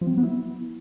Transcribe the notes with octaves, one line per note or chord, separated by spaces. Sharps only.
F3
C4
F#3
B3
E4